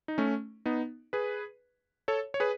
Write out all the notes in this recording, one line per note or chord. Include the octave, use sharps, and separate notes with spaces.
D#4
A3 C#4
B3 D#4
G#4 B4
A4 C#5
C#5
G#4 B4